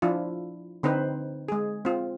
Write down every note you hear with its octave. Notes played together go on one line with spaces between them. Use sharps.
F3 D4 E4 F4
D3 C4 D#4 B4 C5
G#3 G#4
C4 F4